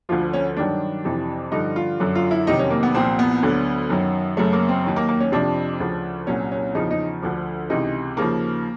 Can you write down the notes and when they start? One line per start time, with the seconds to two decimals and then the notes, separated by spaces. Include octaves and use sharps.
0.09 D2 D3 F3 F4
0.33 C#4
0.57 G2 D#3 F#3 D4
1.04 F2 C3 E3
1.52 G2 D3 F3 D#4
1.76 F4
2.00 F#2 D3 F#3
2.15 F4
2.31 E4
2.47 F2 C3 D#3 F#3 D#4
2.59 C#4
2.70 A#3
2.83 B3
2.94 C2 A#2 F3 C4
3.19 B3
3.42 D2 D3 F#3
3.90 F#2 D#3 F#3
4.37 F#2 C#3 F#3 A3
4.53 A#3
4.68 C4
4.84 D#2 D#3 F#3
4.96 A#3
5.08 A#3
5.20 C#4
5.32 F2 C3 F3 D4
5.80 D2 C#3 F3
6.27 C2 A#2 F#3 C#4
6.52 C#4
6.74 E2 C#3 F3 D#4
6.91 D#4
7.22 D2 D3 F3
7.70 C#2 C3 E3 D#4
8.17 D#2 C#3 F3 A#3